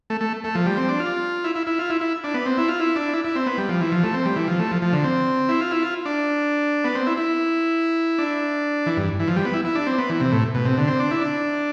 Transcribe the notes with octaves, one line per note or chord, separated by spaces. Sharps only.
A3
A3
A3
F3
G3
C4
D4
F4
E4
E4
E4
F4
E4
E4
D4
B3
C4
E4
F4
E4
D4
E4
E4
C4
B3
G3
F3
E3
F3
A3
C4
G3
E3
F3
A3
F3
F3
D3
C4
E4
F4
E4
F4
D4
B3
C4
E4
E4
D4
E3
G2
E3
F3
G3
B3
E4
E4
D4
C4
B3
E3
C3
A2
B2
C3
D3
C4
D4
E4
D4